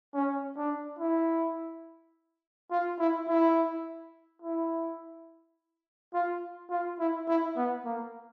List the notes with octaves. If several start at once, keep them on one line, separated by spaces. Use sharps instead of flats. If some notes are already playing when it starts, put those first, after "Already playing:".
C#4
D4
E4
F4
E4
E4
E4
F4
F4
E4
E4
B3
A#3